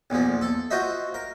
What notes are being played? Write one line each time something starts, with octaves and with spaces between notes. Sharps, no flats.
B1 E2 A#2 F3
A4
F4 F#4 C5 D#5 E5
A#4